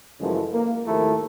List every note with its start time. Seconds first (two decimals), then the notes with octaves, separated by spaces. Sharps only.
0.20 F#2 C#3 E3 F3 G#3 A3
0.53 A#3
0.86 G#1 D#2 F3 A3 E4 A#4